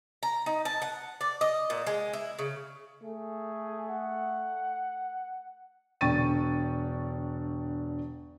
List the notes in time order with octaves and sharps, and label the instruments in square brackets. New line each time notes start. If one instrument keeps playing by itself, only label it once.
[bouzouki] A#5
D#4
A5
F#5
D5
D#5
A#2
G#3
E4
C#3
[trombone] A3 [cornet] G#4
[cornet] F#5
[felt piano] E1 D3 G5 C#6 A6 D#7